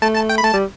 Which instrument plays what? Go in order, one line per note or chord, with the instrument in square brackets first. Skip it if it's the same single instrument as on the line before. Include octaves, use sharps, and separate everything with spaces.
[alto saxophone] A3 [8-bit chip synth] A5
[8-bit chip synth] A5
G5
B5
[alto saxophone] A3 [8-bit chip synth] A5
[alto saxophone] G3